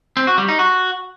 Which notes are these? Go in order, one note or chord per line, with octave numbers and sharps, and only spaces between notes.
C4
F#4
G3
D#4
F#4